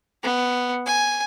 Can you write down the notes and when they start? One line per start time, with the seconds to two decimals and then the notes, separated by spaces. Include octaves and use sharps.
0.23 B3
0.86 G#5